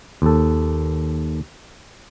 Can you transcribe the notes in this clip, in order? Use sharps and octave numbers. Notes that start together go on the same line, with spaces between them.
D#2 A4